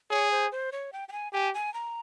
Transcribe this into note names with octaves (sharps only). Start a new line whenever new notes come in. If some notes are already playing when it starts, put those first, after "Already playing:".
G#4 C#5
C5
C5
C#5
G5
G5
G#5
G4 G#5
G#5
A#5